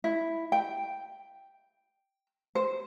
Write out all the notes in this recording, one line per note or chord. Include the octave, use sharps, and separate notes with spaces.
E4
G5
C5